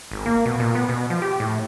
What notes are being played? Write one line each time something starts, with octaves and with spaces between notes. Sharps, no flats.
G#1
A#3
B2
A#2
B3
B2
F3
G4
A2